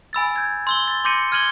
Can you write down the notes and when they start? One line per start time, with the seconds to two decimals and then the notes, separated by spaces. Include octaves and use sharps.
0.13 G#5 B5 E6 A6
0.36 G6 G#6
0.67 C6 E6 G7
0.88 A6
1.04 C6 D6 G6 A#6 C#7 D#7
1.32 F6 G#6 D#7 F#7 G7